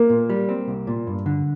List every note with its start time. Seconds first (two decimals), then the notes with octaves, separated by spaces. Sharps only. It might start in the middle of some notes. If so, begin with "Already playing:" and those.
Already playing: A#3
0.10 A#2
0.30 G3
0.49 C4
0.68 C2
0.87 A#2
1.07 G2
1.26 D3